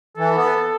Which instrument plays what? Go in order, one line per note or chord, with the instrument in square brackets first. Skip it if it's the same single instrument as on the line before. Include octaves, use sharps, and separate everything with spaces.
[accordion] E3 [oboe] A4
[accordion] B3